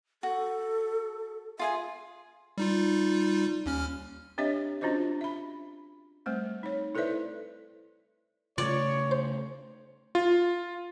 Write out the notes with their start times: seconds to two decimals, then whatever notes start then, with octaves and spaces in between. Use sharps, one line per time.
0.23 F#4 A4
1.59 F4 G#4 E5 G#5
2.58 G3 D#4 F4
3.66 D#2 C#4 F6
4.38 C4 D4 G4 C#5 D#5 E5
4.81 C#4 D4 F4 F#4 C5 D#5
5.21 E5 B5
6.26 G3 A3 C4 C5
6.63 D#4 C#5
6.95 E4 A4 B4 C5 D5 E5
8.58 C#3 A3 F4 C#5 D5
9.11 C5
10.15 F4